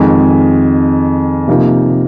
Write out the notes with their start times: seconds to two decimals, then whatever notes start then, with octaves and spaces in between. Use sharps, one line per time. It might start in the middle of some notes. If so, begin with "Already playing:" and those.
Already playing: F2 D#3 G#3 G#5
1.48 C3 F3 A#3 D#4